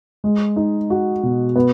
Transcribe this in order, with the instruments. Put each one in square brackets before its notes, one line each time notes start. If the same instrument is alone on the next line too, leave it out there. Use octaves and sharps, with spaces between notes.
[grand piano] G#3
D#4
F#4
B2
B3